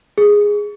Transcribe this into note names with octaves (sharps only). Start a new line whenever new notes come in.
G#4